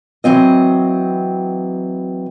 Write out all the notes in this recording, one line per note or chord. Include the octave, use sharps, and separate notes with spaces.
E3 F#3 C4 D#5